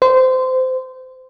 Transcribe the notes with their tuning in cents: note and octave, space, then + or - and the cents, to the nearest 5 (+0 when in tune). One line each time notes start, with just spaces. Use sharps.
C5 -20